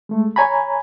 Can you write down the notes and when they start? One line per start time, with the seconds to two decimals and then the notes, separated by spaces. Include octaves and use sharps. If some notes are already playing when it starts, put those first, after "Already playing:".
0.09 G#3 A3
0.36 C#5 G#5 A#5 B5